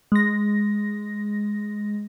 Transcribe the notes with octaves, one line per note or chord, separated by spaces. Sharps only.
G#3 A#6